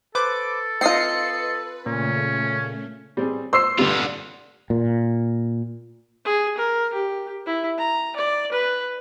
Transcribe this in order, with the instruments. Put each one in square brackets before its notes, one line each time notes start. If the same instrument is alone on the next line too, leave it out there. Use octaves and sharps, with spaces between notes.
[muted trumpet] A4 [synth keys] B4 C5 D6
[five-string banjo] C4 F4 [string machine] B4 [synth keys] D#5 C7 C#7
[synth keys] A#2 [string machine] C#3 A3 [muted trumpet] C#4
[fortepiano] G3 C4 G#4
[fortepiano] C5 [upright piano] C6 E6 C7
[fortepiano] G2 G3 [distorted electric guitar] D3 F4
[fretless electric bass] A#2
[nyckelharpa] G#4
A#4
G4
E4
A#5
D5
B4